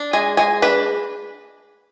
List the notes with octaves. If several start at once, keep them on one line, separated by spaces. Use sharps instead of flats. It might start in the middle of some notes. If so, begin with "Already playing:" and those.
Already playing: D4
G#3 G#5
G#3 G#5
D4 B4